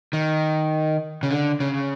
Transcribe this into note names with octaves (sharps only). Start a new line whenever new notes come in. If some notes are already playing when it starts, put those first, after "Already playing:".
D#3
C#3
D3
C#3